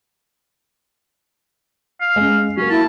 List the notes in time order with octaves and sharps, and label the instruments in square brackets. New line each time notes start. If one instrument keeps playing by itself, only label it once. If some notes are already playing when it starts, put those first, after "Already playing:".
[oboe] F5
[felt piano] G#3 C#4
[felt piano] F#3 A#3 [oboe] C#4
[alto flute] E4 [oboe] A5